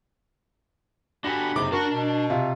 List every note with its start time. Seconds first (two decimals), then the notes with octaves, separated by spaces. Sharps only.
1.24 D4 F#4 G4 A4 F#5 G#5 B5 A#6
1.56 F#1 C3 D#4 D6
1.72 D4 F#4 A#4 A5
1.92 B2
2.30 C3 F4